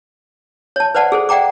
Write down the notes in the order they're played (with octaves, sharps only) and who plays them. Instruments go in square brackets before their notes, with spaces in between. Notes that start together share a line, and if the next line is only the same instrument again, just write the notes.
[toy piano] C#5 A5
B4 C5 D5 F#5 A5
G#4 A4 C5
D5 F#5 G5 A#5 D6